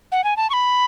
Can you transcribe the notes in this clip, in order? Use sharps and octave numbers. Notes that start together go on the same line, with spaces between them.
F#5
G#5
A5
C#6
B5